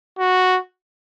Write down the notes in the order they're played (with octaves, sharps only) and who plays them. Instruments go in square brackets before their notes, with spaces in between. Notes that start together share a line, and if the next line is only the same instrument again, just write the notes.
[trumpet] F#4